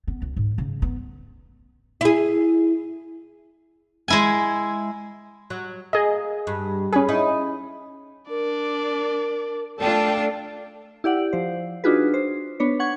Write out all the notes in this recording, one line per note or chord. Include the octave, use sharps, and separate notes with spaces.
B3
C#2
G#2
C#3
B3
E4 G#4
G#3 E4 G#5
F#3
A#3 G#4 D#5
G2
C#4 G#4 B4
D#4 E4
D4 A#4 D5
A3 D4 F4 A4 D5 G5 A5
E4 G4 D5 F#5
F3 C5
D4 D#4 F4 F#4 G#4 B4
C5
B3 D4 B4 C#5
F#5 C#6 G#6